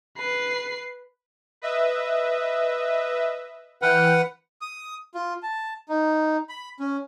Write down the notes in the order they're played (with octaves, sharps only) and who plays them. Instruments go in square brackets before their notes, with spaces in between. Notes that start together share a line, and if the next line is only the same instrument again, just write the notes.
[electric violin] B4 C7
[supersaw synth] B4 D#5 E5
[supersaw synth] E3 G5 F6 [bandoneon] B4 F#5
[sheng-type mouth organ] D#6
F4
A5
D#4
B5
C#4